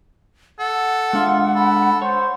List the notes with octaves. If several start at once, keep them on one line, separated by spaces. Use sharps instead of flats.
A4 F#5
G#3 D4 F4 E5
A4 B5
C5 C#5